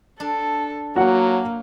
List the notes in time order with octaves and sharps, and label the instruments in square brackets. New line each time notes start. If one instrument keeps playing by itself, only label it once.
[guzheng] D4 [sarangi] A4
[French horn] F#3 [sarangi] A#3 [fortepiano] F#4 F#5